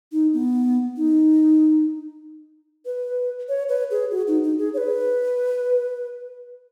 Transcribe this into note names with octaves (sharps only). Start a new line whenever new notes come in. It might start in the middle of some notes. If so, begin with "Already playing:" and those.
D#4
B3
D#4
B4
C#5
B4
G#4
F#4
D#4
D#4
G#4
C#5
B4